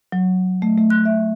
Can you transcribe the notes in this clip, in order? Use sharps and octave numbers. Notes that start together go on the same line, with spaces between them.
F#3
A3
A3
F#6
E5